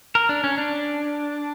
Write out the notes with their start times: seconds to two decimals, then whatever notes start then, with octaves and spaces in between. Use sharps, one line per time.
0.15 A#4
0.29 D4
0.44 C#4
0.58 D4